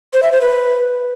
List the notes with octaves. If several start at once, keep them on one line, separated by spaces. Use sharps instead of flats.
C5
E5
C5
B4